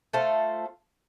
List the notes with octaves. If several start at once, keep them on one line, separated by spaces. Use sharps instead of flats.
A3 F4 A4 C5